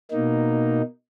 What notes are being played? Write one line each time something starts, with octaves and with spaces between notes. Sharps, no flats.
B2 A#3 D#4